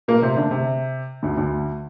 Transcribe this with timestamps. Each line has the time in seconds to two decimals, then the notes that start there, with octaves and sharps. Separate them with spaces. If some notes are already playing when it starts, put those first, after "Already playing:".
0.08 A#2 A#3
0.22 C3 C4
0.37 D3 D4
0.51 C3
1.23 D2 D3
1.37 D2 D3